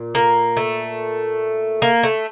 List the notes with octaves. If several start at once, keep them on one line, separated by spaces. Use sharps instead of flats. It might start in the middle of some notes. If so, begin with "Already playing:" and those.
Already playing: A#2
A#3
A3
A#3
A3